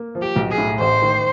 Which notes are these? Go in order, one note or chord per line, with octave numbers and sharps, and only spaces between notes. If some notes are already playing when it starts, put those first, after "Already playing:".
Already playing: A#3
F3
G4
B1
G#4
A2
A1 C5
D#3